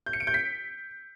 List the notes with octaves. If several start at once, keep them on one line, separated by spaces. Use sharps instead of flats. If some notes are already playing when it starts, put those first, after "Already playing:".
G6
C#7
D7
G6
B6